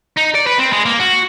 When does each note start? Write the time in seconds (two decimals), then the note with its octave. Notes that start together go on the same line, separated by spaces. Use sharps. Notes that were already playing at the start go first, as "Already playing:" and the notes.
0.17 D#4
0.34 D5
0.46 B4
0.58 C4
0.72 G#3
0.85 A#3
1.00 F#4